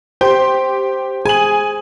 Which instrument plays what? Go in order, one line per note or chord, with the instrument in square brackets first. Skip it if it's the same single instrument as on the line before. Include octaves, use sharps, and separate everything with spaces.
[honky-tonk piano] G4 [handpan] C5
[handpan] G#4 [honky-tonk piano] G#5 F#7